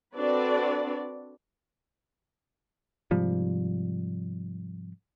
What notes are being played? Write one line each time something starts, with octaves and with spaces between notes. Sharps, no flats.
C4 D4 F#4 A4 B4 D5
G#2 C3 F3 G3